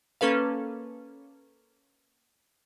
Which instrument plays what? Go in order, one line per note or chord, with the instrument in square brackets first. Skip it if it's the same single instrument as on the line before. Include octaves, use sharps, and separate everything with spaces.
[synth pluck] A#3 C#4 A4 B4 F5